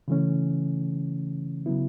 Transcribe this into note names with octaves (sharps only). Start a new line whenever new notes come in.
C#3 E3 A3 C#4
C#3 F#3 B3 E4